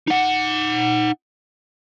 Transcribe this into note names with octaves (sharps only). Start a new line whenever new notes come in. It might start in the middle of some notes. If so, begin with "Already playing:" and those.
D#4 F#5